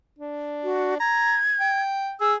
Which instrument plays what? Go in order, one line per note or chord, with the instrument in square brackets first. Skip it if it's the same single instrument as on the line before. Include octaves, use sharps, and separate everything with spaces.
[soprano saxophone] D4
[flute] F#4
[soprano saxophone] A#5 [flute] G#6
[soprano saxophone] G5
[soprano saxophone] G#4 [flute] E6